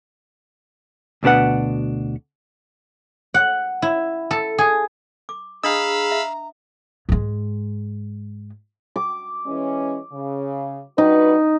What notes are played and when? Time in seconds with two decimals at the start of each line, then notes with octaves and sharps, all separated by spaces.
1.23 D2 B2 D4 B4 F#5
3.34 F#5
3.82 E4
4.31 A4
4.58 G#4
5.29 D6
5.63 D4 G#4 D#5 F5 A#5 B5 D#6 E6
6.12 E5
7.09 G#2 G#3
8.96 D6
9.46 E3 G#3 C#4
10.12 C#3
10.98 G3 D#4 F#4 B4